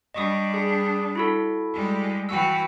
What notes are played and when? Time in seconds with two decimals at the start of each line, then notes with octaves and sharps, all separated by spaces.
0.14 G3 D4 D#5 C#6 D#6
0.54 G#4
1.15 E4 F#4 A4
1.72 G3 G#3
2.29 E3 F#4 G5 E6